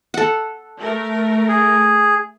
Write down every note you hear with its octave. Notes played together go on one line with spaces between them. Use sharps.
A4 F#5
A3 A#4
G#4